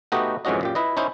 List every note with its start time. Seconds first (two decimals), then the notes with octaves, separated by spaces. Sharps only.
0.12 A3 B3 D#4 F#4 G4 D#5
0.45 F2 G#2 E3 C#4 F#4 D#5
0.61 F#2 A#2 G4
0.75 E4 B4 D#5
0.97 C#4 D#4 E4 C5